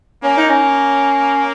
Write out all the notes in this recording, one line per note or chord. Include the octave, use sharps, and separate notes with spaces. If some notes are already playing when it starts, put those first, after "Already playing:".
A#3 C#4
D#4
C#4